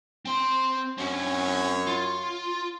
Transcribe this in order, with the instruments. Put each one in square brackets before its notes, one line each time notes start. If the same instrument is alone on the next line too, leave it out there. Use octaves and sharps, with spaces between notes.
[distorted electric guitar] C4 C6
[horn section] F#2 C#5 [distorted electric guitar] C4 C#4
[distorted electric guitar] F4